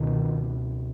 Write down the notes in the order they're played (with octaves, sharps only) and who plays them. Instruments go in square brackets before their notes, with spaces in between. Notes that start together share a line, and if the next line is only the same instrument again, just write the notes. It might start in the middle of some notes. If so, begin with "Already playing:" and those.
Already playing: [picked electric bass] C#2 B2 D#3